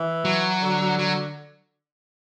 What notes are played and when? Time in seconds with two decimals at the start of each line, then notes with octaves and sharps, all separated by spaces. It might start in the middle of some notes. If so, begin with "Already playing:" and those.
Already playing: E3
0.25 F#3
0.62 D3
0.99 F#3